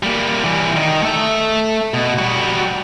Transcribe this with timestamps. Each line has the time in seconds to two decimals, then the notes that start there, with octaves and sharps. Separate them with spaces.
0.03 G3 A#3
0.44 E3 G3
0.76 D#3
1.03 A3 E5
1.94 B2
2.18 G3 F#4